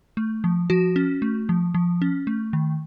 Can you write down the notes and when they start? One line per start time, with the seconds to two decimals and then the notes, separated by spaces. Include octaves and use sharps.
0.17 A3
0.44 F3
0.70 F3 F#4
0.96 C#4
1.22 A3
1.49 F3
1.74 F3
2.02 C#4
2.27 A3
2.53 D#3